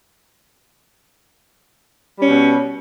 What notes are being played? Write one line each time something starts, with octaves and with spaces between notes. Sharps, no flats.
B2 G3 C#4